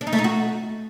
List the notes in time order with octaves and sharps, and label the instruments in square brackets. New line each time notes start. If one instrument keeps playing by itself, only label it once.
[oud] D4
D#4
A3
D#4
F#4